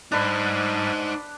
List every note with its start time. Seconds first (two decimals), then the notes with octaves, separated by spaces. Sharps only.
0.12 G#2 G3 D4 D#4 B4 C5